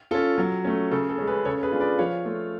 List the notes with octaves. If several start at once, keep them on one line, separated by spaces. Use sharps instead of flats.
C#4 F4 A4
F#3
A3 C#4
C#3 A4
A4
G#3 C#4
G#4 B4
C#3 A4 C#5
G#4 B4
G#3 D4 F4
B4 D5
F3 C#5 F5
A3 F4